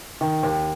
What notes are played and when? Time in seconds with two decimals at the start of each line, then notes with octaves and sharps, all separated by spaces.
0.21 D#3
0.43 D#2